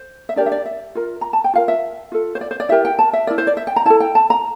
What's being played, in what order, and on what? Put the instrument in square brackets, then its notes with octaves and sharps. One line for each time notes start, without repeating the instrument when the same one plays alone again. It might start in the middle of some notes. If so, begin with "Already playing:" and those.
Already playing: [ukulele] C5
E5
D4 G4 A#4 D5
E5
D5
E5
F4 A#4
A#5
A5
G5
F4 A#4 F5
E5
F4 A4
C5
D5
C5
D5
E4 G4 A#4 E5
G5
A5
E5
E4 A#4 D5
C5
D5
E5
G5
A#5
E4 A4 A5
G5
A5
A#5